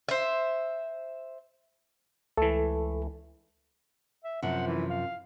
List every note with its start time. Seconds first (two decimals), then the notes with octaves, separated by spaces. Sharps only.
0.08 C5 E5
2.37 C#2 E3 A3 A4
4.24 E5
4.42 F#2 C3 F3 F#5
4.67 E3
4.90 F5